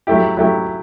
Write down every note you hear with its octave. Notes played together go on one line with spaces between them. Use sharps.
F#3 A3 E4 G4
F#3 A3 E4 G4